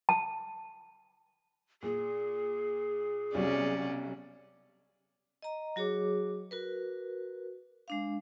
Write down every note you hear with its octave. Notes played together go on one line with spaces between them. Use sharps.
A5
A#2 G#4
B1 C3 G3 C#4 F#4 D5
D#5 A#5
F#3 F#4 G#4 C#5 D6
F#4 A#4 B4
G#3 D4 F5